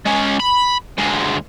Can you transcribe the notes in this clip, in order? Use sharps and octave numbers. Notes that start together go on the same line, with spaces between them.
G#3 C#4
B5
D2 G#3